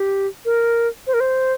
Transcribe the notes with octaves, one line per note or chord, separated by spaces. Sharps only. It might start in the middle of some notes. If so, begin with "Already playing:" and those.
Already playing: G4
A#4
C5
A#4
C5